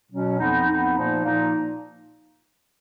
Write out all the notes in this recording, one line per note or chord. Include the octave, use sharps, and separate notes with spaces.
B2 F#3 C#4
F2 F3 B3 D#4
F2 F3 B3 D#4
A#2 F3 A#3 D#4
A#2 F3 A#3 D#4